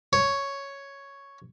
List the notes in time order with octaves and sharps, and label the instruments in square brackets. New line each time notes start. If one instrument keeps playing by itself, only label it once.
[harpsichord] C#5